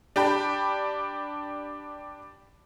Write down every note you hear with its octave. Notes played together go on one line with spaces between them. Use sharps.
D4 G4 G5 B5